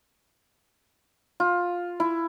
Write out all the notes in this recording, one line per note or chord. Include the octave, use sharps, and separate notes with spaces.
F4
E4